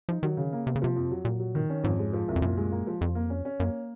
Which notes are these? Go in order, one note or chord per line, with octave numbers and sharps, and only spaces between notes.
F3 D#4
D#3 F#3
C#3
A#3
C3 A#3
C#3
C3 F3
F2
F#3
A#2 F#3
F#3
D#3
C#4
F2 G#2
G#3
F3
C2
F2
F#2 A#2
G#3
A#3
F3
F2 F3
A#3
C#4
C#4
F#2 A#3